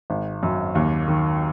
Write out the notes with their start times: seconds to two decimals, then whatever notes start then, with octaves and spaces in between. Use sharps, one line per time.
0.10 G#1
0.43 F#2
0.75 D#2
1.08 D#3